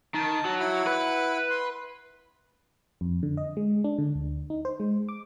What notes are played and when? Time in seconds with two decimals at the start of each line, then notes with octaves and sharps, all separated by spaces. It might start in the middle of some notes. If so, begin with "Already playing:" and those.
0.14 D#3 A5
0.45 F#3
0.60 E4 F#5 B5
0.87 B4
1.50 C6
3.01 F2
3.23 D3
3.37 D#5
3.57 G#3
3.84 D4
3.98 D3
4.15 D2
4.50 D#4
4.65 C5
4.80 G#3
5.09 D6